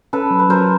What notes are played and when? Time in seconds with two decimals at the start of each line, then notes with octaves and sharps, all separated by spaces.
0.13 C#4 A4 B4
0.31 F#3
0.39 B4
0.49 F#3 A#4 C5